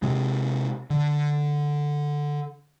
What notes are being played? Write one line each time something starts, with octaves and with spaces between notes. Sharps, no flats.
C3 G#3
D3